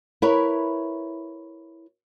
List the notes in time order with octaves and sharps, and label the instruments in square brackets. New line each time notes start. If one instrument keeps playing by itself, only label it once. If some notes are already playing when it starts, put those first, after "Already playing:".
[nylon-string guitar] E4 A#4 B4 C#5